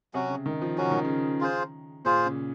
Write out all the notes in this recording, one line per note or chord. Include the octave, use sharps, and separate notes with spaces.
C3 F#3 C#4 F#4
C#3
D#3
F3
C#3 F#3 C#4 F#4
D#3
C#3
F4 G#4 C5
A#2 F4 G#4 C5
C#3